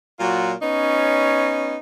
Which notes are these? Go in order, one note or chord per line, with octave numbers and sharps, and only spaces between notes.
A#2 F#3 F4 F#4
B3 C#4 D#4 C#5